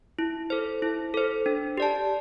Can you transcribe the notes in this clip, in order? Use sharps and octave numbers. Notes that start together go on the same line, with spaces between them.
E4
A4 C5
E4
A4 C5
D4
G4 D5 A5